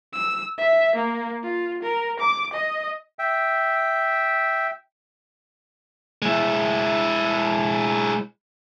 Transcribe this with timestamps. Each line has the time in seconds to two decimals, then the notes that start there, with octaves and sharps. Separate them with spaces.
0.13 E6
0.58 E5
0.96 A#3
1.43 F4
1.83 A#4
2.19 D6
2.53 D#5
3.19 E5 G5
6.22 G#3 E4